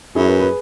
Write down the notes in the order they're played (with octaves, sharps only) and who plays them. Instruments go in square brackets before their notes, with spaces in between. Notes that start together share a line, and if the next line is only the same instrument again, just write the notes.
[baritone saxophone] F#2 [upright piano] E4 G#4
[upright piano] G#4 B4
G#4 B4